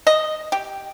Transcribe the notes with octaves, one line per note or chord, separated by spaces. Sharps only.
D#5
G4